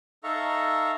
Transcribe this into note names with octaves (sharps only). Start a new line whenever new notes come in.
D#4 A4 E5 F5 A#5 C#6